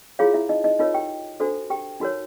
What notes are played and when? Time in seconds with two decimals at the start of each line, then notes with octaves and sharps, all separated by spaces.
0.19 E4 F4 G#4 C#5 F5
0.34 E4 E5
0.49 D#4 D#5
0.64 D#4 D#5
0.79 D#4 F4 A#4 C#5 D#5
0.94 G4 G5
1.40 D4 F#4 A4 C5
1.70 G4 G5
2.00 D#4 F#4 A#4 C#5